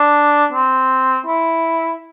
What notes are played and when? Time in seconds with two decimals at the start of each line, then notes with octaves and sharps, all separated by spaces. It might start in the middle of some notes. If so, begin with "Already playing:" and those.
Already playing: D4
0.52 C4
1.26 E4